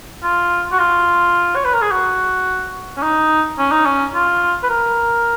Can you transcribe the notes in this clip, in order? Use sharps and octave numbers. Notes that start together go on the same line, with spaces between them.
F4
F#4
F4
C#5
B4
A#4
G#4
F#4
C#4
D#4
C#4
D#4
C#4
F4
B4
A#4